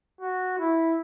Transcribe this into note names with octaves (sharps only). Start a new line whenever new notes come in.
F#4
E4